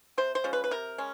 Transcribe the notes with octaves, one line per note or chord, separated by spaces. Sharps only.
C3 C5
C5
F3 G#3 C#4
B4
B4
C3 A#4
G#3 C#4